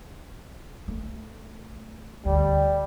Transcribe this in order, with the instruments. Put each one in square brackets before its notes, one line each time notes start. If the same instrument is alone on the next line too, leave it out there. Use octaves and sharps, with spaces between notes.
[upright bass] A3
[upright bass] D2 [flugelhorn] G3